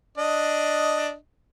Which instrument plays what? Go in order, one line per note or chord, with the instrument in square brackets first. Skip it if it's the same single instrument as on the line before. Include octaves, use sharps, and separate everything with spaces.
[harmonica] D4 D#5